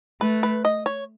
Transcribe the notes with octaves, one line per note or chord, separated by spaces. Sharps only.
A3 B4
B4
D#5
C#5